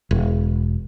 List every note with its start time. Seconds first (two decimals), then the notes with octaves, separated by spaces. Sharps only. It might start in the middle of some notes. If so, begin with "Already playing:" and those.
0.11 E1